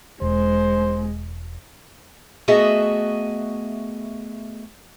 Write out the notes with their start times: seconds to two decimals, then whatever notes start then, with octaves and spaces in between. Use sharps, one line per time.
0.22 E1 G#3 C5
2.48 A3 B3 F#4 G#4 D#5 E5